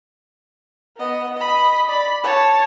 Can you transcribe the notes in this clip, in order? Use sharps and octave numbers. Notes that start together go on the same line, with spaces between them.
B3 D#5
D#5 B5
D5 B5
C#5 A5